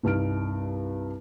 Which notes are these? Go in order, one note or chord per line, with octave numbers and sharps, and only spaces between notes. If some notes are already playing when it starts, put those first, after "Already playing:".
C2 G2 D#4 F6 D7